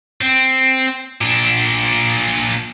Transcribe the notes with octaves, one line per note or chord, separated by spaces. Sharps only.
C4
A#2 D4